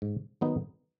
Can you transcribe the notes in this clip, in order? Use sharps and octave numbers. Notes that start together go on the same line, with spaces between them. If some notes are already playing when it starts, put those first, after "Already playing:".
G#2
D#3 F#3 B3 D#4